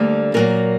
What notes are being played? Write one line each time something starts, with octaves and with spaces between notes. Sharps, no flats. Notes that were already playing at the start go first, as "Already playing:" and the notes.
Already playing: D2 D3 G3 A#3 D5
A#2 F#3 A#3 A#4